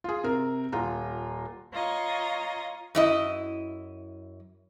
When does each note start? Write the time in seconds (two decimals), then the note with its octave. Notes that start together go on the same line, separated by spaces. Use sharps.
0.04 F4 G#4
0.24 C3 A#4
0.72 D#1 F4 A#5
1.73 F4 C#5 D#5 A#5
2.95 F#2 E4 D#5